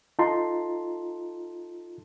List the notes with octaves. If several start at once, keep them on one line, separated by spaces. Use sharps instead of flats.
D#4 F4 A4 A5 A#5 C6